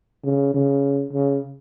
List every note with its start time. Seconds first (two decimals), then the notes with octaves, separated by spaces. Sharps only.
0.24 C#3
0.54 C#3
1.13 C#3